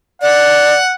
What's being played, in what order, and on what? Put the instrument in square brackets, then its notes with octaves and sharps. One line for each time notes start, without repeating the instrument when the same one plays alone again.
[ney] D5 [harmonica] F#5